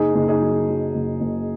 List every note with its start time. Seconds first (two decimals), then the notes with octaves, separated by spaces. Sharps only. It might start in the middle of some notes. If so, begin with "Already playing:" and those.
Already playing: F#1 D#4 G#4
0.15 F#1
0.28 D#4 G#4
0.41 F#3
0.69 F#3
0.94 F#1
1.21 F#1